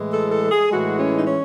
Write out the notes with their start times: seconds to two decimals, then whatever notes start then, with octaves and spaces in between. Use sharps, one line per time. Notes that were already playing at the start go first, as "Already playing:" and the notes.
Already playing: A2 E3 G#3
0.10 A4
0.31 A4
0.51 G#4
0.71 A2 E3 G#3 F#4
0.98 C#4
1.15 D#4
1.26 C#4